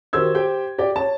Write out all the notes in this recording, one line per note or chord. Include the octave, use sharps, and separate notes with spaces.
D#3 F#4 G4 C5 E6 G#6
G4 C5 G5
G4 D5 G5
C#5 A5